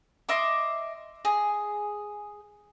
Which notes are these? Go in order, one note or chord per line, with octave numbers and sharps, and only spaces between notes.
D#5 E5 C6 D6
G#4